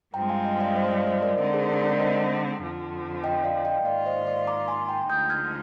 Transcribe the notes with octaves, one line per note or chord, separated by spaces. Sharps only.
G2 F3 G#3 C4 G5 A#5
F5 G#5
D#5 G5
D5 F5
C5 D#5
D5 F5
C5 D#5
A#4 D5
D3 G#3 C4 D#4 A#4
G#4 C5
A#4 D5
A#4 D5
C5 D#5
F2 D3 F3
D#5 G5
D5 F5
D#5 G5
G#2 D#3 A#3 F4 D5 F5
C5 D#5
D5 F5
A#5 D6
G#5 C6
G5 A#5
D2 D3 F3 G#3 D#4 D#6 G6
F6 G#6